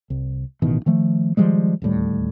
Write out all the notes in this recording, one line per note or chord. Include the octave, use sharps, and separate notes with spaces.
C2
A1 B2 D#3
D#3 F3 A3
D#3 F3 G3 G#3
D1 D#2 A2 G3